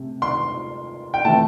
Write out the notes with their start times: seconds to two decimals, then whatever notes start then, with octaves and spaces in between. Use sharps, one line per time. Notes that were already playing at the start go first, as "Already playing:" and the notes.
Already playing: C3 A3
0.22 C6
1.14 G5
1.25 C3 E3 A3 A5